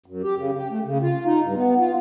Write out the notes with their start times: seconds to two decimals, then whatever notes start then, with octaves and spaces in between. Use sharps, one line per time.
0.06 F#2
0.23 G4
0.36 C#3
0.58 G4
0.70 A3
0.84 C#3
1.01 F4
1.25 D#4
1.41 G2
1.54 B3
1.79 F4